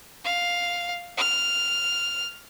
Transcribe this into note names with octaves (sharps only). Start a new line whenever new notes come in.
F5
F6